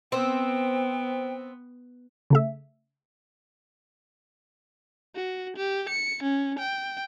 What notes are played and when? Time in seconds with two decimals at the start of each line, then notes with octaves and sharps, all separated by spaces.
0.12 B3 C4 G5
2.30 C#3 A3 E5
5.15 F#4
5.57 G4
5.89 C#7
6.23 C#4
6.59 G5